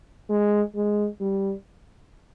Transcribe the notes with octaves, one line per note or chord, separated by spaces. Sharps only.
G#3
G#3
G3